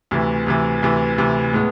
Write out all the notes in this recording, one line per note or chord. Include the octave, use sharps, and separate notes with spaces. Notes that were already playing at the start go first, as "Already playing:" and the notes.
D2 C3 E3
D2 C3 E3
D2 C3 E3
D2 C3 E3
A2 G#3 B3